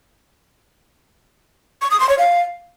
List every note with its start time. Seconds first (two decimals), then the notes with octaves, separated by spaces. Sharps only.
1.82 C#6
1.91 D#6
2.00 C6
2.09 C#5
2.19 F5